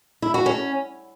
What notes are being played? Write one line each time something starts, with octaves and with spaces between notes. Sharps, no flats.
E4
F#4
C#4